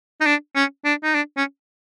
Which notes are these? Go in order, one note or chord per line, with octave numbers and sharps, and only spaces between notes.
D#4
D4
C#4
D4
D#4
D4
C#4